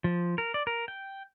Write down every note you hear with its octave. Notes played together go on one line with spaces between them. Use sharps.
F3
A#4
D5
A#4
G5